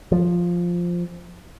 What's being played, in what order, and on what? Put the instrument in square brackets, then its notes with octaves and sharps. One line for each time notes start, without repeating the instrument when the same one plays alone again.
[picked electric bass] F3